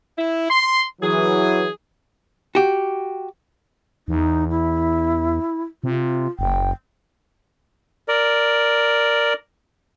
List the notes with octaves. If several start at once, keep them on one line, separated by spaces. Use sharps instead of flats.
E4
C6
E3 F#3 G#4
F#4 G4
E2 D#4
E4
C3 F4
F#1 G5
A#4 D5